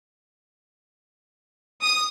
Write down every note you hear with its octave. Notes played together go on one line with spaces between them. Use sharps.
D#6